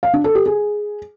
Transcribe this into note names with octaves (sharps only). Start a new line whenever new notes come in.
F5
D4
A4
G4
G#4